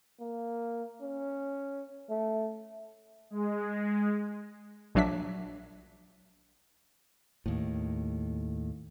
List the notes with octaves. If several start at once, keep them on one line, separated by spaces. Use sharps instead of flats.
A#3
C#4
A3
G#3
A#1 F#3 D4 E5 B6
D#2 A2